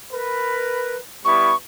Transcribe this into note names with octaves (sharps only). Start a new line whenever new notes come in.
A#4 B4
G3 B3 E4 C#6